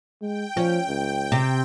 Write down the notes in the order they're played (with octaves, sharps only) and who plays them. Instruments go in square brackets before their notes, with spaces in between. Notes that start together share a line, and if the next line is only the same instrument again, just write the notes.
[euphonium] G#3 [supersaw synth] G5
[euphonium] F3 [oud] C#4
[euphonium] C#2
[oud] C3